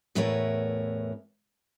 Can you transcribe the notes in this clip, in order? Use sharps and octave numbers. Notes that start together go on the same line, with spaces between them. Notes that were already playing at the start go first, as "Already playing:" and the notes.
E2 A2 B3 E4 A#4 C#5